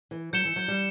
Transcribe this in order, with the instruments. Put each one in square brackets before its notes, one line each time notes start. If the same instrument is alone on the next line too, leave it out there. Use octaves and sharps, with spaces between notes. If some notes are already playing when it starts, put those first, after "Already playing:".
[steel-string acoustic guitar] E3
[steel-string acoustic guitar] F#3 [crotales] G6 C#7 E7 G7
[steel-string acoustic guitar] E3
F#3
G3